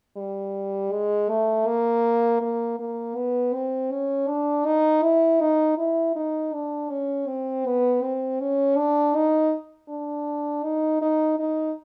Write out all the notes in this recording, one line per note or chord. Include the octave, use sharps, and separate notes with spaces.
G3
G#3
A3
A#3
A#3
A#3
B3
C4
C#4
D4
D#4
E4
D#4
E4
D#4
D4
C#4
C4
B3
C4
C#4
D4
D#4
D4
D#4
D#4
D#4